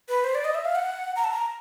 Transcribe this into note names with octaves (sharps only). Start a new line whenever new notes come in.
B4
C5
D5
D#5
E5
F5
F#5
A#5
A5
A#5